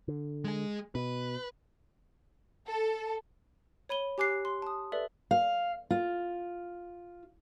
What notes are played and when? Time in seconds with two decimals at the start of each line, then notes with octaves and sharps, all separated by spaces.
0.08 D3
0.44 G#3 G#4
0.95 B2 B4
2.68 A4
3.89 C#5 B5 D#7 G7
4.18 G4 G#5 D6 F#6 C7
4.45 C6
4.62 A5 D#6
4.92 A4 B4 D5 E5
5.31 F5
5.91 F4